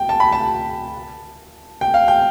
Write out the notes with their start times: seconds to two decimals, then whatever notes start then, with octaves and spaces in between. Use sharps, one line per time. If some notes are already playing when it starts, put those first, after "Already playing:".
Already playing: G5
0.09 A5
0.20 B5
0.32 A5
1.81 G5
1.94 F5
2.08 G5